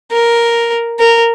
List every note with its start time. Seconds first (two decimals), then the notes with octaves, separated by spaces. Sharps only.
0.11 A#4
0.99 A#4